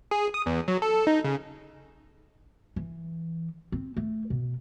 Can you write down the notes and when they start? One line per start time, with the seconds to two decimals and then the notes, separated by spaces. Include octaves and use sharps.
0.11 G#4
0.34 D#6
0.46 E2
0.68 F#3
0.82 A4
1.07 D#4
1.24 C#3
2.76 E3
3.72 C4
3.97 A3
4.30 B2